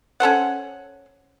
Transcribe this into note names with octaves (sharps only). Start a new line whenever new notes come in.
C#4 A4 C5 F#5